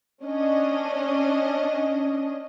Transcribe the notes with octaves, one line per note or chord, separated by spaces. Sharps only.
C#4 D4 D#5